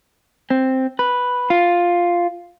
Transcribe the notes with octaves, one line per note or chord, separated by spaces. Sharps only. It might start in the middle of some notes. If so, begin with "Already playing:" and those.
C4
B4
F4